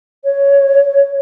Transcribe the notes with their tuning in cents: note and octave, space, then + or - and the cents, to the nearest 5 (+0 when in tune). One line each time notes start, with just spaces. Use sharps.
C#5 +10